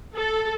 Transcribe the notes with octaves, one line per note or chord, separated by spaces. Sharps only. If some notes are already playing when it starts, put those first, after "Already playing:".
A4